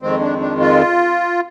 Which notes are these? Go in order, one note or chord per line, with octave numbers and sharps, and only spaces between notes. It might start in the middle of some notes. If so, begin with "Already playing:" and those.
F2 D#3 G#3 C4
D4
D4
F4